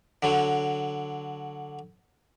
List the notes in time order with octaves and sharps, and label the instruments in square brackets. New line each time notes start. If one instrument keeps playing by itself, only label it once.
[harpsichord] D3 F#3